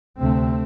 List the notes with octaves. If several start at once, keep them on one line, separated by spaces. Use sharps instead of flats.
D2 C3 A3 C4